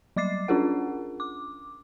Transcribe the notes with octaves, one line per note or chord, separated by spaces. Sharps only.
F#3 G3 D6 A6 C7
C#4 D4 F4 G#4 A#4 F#5
D6